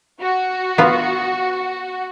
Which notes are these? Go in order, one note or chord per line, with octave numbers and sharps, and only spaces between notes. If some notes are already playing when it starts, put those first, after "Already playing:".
F#4
B3 F4